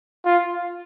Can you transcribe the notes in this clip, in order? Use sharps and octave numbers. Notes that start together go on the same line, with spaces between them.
F4